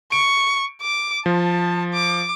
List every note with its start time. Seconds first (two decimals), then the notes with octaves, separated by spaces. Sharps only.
0.12 C#6 D7
0.82 D6
1.26 F3 A5
1.93 D6